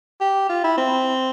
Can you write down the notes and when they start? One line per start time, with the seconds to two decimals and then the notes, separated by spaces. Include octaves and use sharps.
0.21 G4
0.49 F4
0.64 E4
0.78 C4